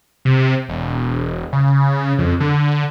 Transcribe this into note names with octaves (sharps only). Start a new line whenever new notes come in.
C3
E1
C#3
F2
D3